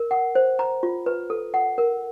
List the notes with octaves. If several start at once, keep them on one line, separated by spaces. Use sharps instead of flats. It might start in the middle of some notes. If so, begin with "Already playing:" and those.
Already playing: A#4
F#5
C5
A#5
F4
B4
A4
F#5
A#4